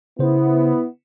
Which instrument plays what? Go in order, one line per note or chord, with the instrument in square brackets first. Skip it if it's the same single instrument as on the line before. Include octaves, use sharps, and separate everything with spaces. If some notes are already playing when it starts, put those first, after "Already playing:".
[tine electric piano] C#3 C5 [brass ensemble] B3 E4